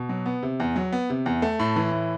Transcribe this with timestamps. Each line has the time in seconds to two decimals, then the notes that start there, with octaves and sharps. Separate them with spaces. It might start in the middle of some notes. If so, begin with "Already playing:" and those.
Already playing: B2
0.09 F#3
0.26 B3
0.43 C3
0.60 E2
0.76 F#3
0.92 B3
1.10 C3
1.26 E2
1.42 A3
1.59 A2
1.76 E3
1.92 A2